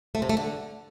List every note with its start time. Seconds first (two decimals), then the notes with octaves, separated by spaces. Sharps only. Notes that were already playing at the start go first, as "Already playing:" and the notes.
0.15 A3
0.22 C3
0.29 A3
0.37 D3